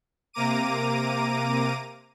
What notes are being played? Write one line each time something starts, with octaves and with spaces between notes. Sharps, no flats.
C3 A#3 A#5 D6 D#7